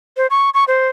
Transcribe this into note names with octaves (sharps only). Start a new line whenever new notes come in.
C5
C#6
C#6
C5